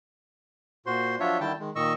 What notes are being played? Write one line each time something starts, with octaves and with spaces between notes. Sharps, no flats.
A#2 F#4 C5 C6
F3 F#3 D4 F4 C#5 E5
D3 D#3 G3 E4 G5 A5
D#3 G#3
A#2 D#3 D#5 C#6 E6